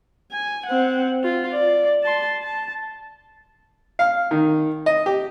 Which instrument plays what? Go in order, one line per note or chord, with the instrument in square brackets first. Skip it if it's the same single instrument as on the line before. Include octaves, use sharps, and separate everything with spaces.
[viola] G#5
C4 F#5
F4
D5
A5 C6
A5
[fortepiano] F5
D#3
D#5
G4